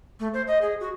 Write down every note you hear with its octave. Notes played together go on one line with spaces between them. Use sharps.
A3
C5
D#5
G#4
F#4